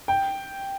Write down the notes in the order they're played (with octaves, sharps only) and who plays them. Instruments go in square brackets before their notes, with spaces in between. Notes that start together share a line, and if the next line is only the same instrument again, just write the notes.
[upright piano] G5